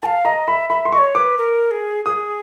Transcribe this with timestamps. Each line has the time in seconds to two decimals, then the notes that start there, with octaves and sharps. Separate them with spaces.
0.02 G#5 A5
0.06 F5
0.25 D#5 A#5
0.48 E5 B5
0.70 E5 B5
0.85 C6
0.92 D#5 C#6
0.98 C#5
1.15 B4 D6
1.38 A#4
1.71 G#4
2.05 G#4 D#6